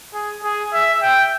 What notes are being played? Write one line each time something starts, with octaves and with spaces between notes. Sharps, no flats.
G#4
G#4
E5
G5